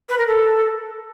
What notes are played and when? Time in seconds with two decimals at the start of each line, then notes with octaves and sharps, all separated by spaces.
0.09 B4
0.18 A#4
0.27 A4